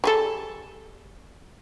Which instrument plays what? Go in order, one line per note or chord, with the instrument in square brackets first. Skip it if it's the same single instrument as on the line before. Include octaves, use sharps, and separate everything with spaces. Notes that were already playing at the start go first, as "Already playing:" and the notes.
[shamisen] G3 G#4 A4